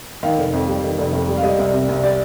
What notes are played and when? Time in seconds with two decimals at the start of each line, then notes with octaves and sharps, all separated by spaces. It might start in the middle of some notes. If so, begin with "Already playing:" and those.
0.23 D#3 F5
0.38 F1
0.53 F2
0.68 G3
0.84 D#3
0.98 F1
1.13 F2
1.28 G3
1.37 F5
1.44 G3 D#5
1.58 C2
1.73 C3
1.89 C2
2.03 G3 D5